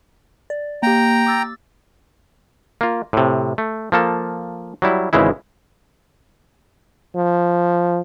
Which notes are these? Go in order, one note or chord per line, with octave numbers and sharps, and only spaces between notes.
D5
A#3 G4 G5 A#5
D6 E6 A6
A#3 F4
A2 C3
A3
F3 A#3 A4
F#3 G3 E4
G#1 C#3 E3 G#3 E4
F3